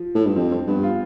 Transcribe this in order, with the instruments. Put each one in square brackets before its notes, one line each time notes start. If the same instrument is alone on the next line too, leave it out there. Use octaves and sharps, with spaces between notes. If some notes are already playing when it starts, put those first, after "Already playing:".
Already playing: [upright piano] F3
[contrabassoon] A2
G2
[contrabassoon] F2 [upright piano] C4
[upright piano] C4
[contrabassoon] G2 [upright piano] B3
[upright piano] F4